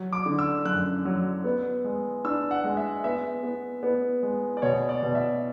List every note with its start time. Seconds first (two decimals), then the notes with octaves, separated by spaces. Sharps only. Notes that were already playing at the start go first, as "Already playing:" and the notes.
Already playing: F#3
0.13 D6
0.26 D3
0.39 E6
0.65 F#2 F#6
1.05 F#3
1.44 B3
1.84 G#3
2.24 D4 E6
2.51 F#5
2.64 G#3
2.77 E5
3.04 B3 E5
3.43 B3
3.83 B3
4.23 G#3
4.57 D5
4.62 B2 C#5
4.89 D5
5.03 B2
5.15 E5